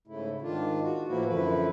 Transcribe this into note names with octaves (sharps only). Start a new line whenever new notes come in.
G#2 C#3 A3 E4
G#2 D#3 D4 F4
F#4
A2 E3 F3 A#3 E4 F#4
F#2 D3 F3 E4 B4